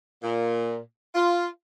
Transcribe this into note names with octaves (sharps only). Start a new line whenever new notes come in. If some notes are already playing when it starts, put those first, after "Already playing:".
A#2
F4